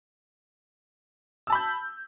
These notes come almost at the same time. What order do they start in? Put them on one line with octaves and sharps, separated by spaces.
E6 A5 B5 G6